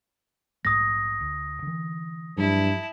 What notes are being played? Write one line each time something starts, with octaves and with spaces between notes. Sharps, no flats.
A#1 G#2 A3 D#6 A#6
D2
D3 E3
G2 F3 F#3 E4 A5